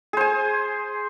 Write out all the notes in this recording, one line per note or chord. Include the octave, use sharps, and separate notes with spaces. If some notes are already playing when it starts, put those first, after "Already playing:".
G#4 C5 G#5